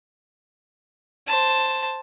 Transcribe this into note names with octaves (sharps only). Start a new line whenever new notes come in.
C5 A5